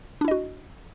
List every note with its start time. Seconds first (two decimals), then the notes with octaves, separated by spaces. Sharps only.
0.21 D4
0.25 E4
0.28 D#5
0.31 F#4